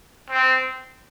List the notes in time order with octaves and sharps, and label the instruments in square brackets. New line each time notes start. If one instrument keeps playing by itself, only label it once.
[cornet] C4